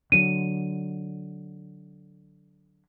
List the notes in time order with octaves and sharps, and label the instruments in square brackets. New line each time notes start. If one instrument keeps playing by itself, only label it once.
[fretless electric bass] D3 F#3 [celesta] D#7